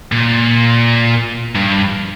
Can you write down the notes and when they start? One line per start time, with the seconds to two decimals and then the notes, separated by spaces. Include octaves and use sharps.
0.12 A#2
1.55 G2